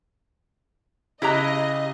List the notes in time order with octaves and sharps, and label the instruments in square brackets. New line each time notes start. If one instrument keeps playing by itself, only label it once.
[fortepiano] C#3 F#6 [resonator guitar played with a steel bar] E4 G4 A#5 [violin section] D#5